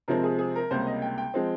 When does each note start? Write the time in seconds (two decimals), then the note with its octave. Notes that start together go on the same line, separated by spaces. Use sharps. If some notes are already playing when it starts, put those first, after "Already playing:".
0.08 C3 F3 G#3 C4 A#4
0.23 G#4
0.39 G#4
0.56 A#4
0.71 C#2 C3 G3 A#3 C5
0.87 D#5
1.02 G5
1.18 G5
1.34 F3 G#3 C4